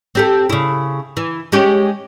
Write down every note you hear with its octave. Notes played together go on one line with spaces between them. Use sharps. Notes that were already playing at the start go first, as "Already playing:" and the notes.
C4 G4 A4
C#3 E4
E3
G#3 C#4 G4